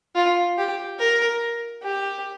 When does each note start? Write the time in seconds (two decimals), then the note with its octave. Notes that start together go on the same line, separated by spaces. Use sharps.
0.15 F4
0.58 G4
0.99 A#4
1.82 G4